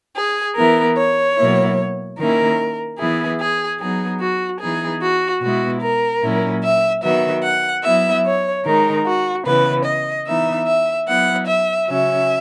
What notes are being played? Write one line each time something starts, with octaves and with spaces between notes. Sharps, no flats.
G#4
E3 B3 E4 A#4
C#5
B2 F#3 A#3 E4
D#3 A#3 C#4 E4 A#4
E3 B3 E4 G#4
G#4
F#3 B3 D#4 G#4
F#4
E3 B3 D#4 G#4
F#4
B2 G#3 B3 E4 F#4
A#4
A#2 F#3 C#4 E4
E5
D#3 F#3 B3 E5
F#5
F#3 B3 E4 E5
C#5
D#3 G#3 D#4 A#4
F#4
C#3 E3 B3 B4
D#5
E3 B3 D#4 E5
E5
F#3 B3 E4 F#5
E5
C#3 F#3 C#4 E5